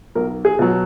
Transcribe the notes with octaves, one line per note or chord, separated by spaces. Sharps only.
B1 A#4
G#4
B2 F#3